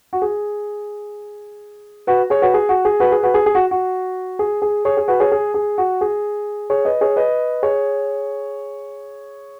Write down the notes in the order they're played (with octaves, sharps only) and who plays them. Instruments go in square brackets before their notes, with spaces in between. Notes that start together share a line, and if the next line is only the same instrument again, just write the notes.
[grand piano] F#4
G#4
F#4 B4
G#4 C#5
F#4 B4
G#4
F#4
G#4
F#4 B4
G#4
F#4 B4
G#4
G#4
F#4
F#4
G#4
G#4
G#4 C#5
G#4
F#4 B4
G#4 C#5
G#4
G#4
F#4
G#4
G#4 C#5
B4 D#5
G#4 C#5
B4 D#5
G#4 C#5